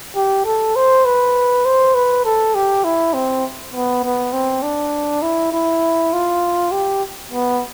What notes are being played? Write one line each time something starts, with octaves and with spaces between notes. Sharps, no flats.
G4
A4
C5
B4
C5
B4
A4
G4
E4
C4
B3
B3
C4
D4
E4
E4
F4
G4
B3